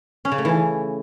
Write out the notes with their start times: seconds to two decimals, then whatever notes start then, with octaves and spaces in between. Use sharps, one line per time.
0.25 C#4
0.32 C#3
0.38 A3
0.45 E3